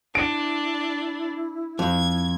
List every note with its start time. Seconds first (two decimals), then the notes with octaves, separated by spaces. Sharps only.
0.15 D4 E4 D7
1.79 F2 G#6